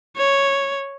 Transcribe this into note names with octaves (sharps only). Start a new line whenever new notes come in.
C#5